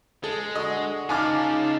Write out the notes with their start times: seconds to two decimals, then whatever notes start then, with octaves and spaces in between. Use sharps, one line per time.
0.24 G#3 A4
0.55 D3 F#4 D#5
1.09 C#3 D#4 F4 G#5 A5 D6 F6